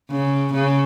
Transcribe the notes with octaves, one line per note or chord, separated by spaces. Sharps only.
C#3
C#3